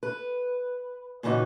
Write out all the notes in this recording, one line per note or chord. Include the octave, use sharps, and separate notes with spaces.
B4
A#2 C#3 E3 D#4 F#4